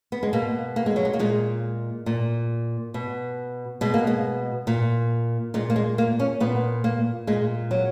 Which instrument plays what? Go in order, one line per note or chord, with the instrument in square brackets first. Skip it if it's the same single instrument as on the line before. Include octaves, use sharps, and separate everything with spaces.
[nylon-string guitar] B3
G#3
B2 A#3
A#3
G#3
F#3
G#3
A#3
A#2 G#3
A#2
B2
B2 G#3
A#3
G#3
A#2
A#2 G#3
A#3
G#3
A#3
C#4
A#2 B3
A#3
A#2 G#3
F#3